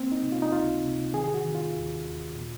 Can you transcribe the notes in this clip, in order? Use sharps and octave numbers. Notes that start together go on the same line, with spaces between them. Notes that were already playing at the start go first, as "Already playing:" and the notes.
Already playing: A#3 C4
D#4
C3
F4
D#4
C#2 F4
C3
D#3 G#4
G#4
F#4
D#3
F4
D#2
D#2
A#2